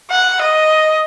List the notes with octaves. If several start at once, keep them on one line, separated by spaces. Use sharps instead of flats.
F#5
D#5